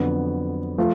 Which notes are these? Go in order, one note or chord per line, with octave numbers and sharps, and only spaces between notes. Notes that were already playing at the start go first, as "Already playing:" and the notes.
Already playing: F2 D3 F#3 B3
F3 A3 F4